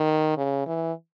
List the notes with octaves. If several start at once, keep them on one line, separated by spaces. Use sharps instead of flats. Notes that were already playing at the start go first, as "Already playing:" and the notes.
Already playing: D#3
C#3
E3